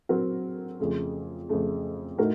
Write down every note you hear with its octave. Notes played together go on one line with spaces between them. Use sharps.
F#3 C4 F#4 A#4
F2 C#3 A3
F2 C#3 A3
A2 A3 D#4 F#4 A#4